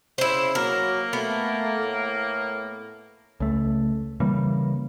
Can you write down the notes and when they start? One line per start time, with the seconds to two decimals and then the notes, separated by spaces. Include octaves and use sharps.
0.18 C#3 E4 C5
0.55 F#3 A#3 A#4
1.13 A3 B3
1.80 A2
3.40 C#2 A3
4.20 C#3 E3 G3 A#3